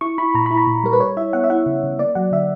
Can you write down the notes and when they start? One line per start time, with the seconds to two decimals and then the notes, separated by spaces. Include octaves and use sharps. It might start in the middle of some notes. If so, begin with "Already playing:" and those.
0.01 E4 C#6
0.18 E4 B5
0.35 A#2 A#5
0.46 E4 B5
0.57 A#5
0.67 A#2
0.84 G3 A#4
0.93 B4
1.00 G3 C#5
1.17 E4 E5
1.33 B3 F#5
1.44 E5
1.50 E4 F#5
1.66 C#3
1.83 C#3
1.99 A#3 D5
2.15 F#3 F#5
2.32 D3 E5